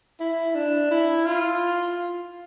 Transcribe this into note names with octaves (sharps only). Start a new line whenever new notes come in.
E4
D4
E4
F4